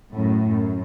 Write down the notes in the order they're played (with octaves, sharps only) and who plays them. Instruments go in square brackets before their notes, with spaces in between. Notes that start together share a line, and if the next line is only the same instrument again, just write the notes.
[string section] F#2 A2
F#2